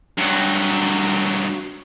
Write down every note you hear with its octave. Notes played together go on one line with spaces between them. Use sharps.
G2 F#3